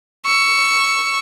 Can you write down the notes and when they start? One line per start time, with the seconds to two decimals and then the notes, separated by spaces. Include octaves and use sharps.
0.25 C#6 E6